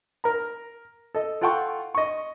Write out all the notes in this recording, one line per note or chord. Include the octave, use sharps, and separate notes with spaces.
A#4 A#5
A4 D#5
F4 A4 F#5 G5 A5 C#6
D#5 C#6